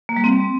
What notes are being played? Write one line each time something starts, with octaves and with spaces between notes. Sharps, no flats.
A#3
G3
C4